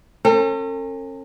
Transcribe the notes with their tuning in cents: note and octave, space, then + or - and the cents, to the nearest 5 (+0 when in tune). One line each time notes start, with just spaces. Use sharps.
C#4 -40 A4 +45